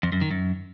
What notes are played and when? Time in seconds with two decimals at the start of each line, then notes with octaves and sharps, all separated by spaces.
0.03 F2
0.12 F#2
0.21 D#3
0.31 F#2